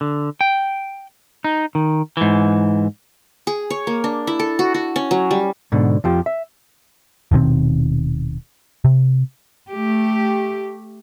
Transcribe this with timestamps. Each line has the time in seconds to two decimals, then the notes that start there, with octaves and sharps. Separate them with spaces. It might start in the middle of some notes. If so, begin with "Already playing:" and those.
0.01 D3
0.41 G5
1.44 D#4
1.75 D#3
2.17 G#2 E3
3.47 G#4
3.70 C#5
3.87 A#3
4.04 D4
4.27 E4
4.39 A4
4.59 F#4
4.74 F#4
4.96 C#4
5.11 F#3
5.31 G3
5.72 G#2 B2 D3
6.04 F2 F3 G4
6.26 E5
7.32 D#1 B2 D#3 C4
8.85 C3
9.69 A3 G4